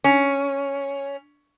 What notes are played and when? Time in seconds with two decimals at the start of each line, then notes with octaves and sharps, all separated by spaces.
0.04 C#4